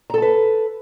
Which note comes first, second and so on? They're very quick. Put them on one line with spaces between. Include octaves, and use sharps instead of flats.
A#5 A4 A5 B4